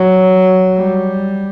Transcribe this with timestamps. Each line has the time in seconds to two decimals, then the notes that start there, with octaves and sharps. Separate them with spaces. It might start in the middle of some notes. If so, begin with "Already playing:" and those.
Already playing: F#3
0.76 G3